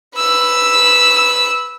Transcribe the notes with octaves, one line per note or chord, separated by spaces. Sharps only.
B4 E6